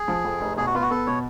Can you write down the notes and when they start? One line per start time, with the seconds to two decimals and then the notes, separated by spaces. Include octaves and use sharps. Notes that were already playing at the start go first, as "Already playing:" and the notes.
Already playing: G#4
0.08 F3
0.25 F2
0.41 F1
0.57 B2 G#4
0.67 F#4
0.75 B3 F4
0.82 F#4
0.90 B3 A4
1.06 B2 C#5